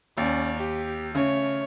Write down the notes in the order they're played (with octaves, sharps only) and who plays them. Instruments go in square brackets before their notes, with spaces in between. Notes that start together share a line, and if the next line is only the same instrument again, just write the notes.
[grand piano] D#2 [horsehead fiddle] C#4 D5
[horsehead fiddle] G4
[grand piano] C#3 [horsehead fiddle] A3 C#5